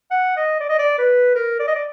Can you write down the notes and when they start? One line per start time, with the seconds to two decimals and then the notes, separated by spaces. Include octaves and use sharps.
0.11 F#5
0.37 D#5
0.60 D5
0.69 D#5
0.79 D5
0.98 B4
1.35 A#4
1.60 D5
1.67 D#5
1.75 D5